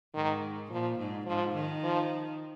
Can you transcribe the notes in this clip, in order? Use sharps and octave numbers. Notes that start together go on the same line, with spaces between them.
G#2 D#3
A#2 F3
G#2
G#2 F3
D#3
F3